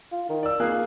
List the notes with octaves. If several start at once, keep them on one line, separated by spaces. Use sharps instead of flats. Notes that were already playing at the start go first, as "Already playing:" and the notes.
F4
D#3
D5 E6
A#3 F4 G#4 F#6